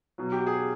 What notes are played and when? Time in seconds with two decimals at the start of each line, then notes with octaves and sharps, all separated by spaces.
0.18 B2 F#3
0.32 G4
0.47 G#4